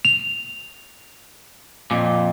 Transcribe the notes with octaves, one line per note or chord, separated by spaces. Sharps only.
F7
F2 A#2